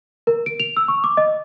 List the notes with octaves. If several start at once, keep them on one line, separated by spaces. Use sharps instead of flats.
A#4
D7
F7
E6
C#6
D6
D#5